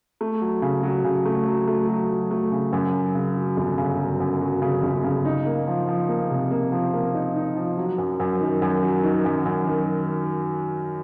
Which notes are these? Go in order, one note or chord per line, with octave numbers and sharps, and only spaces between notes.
A3
F#3
C#3
F#3
C#3
A3
F#3
A3
F#3
F#3
A3
C#3
F#2
F#3
C#3
F#3
G1
C#3
F#3
F#2
F#3
C#3
G1
C#3
D#4
A#3
F3
F3
A#3
C3
A#3
F3
A#3
D#4
D#4
F3
F#3
F#2
F#2
D#3
F#2
F#3
D#3
F#2
F#2
D#3